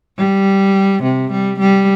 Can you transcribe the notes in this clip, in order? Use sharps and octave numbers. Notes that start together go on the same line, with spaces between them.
G3
C3
G3
G3